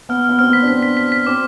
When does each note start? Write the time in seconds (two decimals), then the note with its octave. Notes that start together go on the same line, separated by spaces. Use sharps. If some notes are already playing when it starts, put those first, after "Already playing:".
0.09 B3 F6
0.24 B3 F6
0.39 C4 F6
0.49 B3 B6
0.62 D4
0.68 C4 B6
0.83 B6
0.97 B6
1.12 B6
1.27 C4 D6